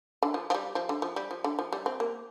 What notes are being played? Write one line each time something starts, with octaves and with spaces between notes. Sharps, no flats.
D3
F3
F3
G3
F3
D3
F3
G3
F3
D3
F3
G3
C4
A#3